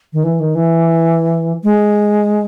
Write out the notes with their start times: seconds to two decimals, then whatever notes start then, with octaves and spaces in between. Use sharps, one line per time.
0.13 D#3
0.24 E3
0.40 D#3
0.55 E3
1.64 G#3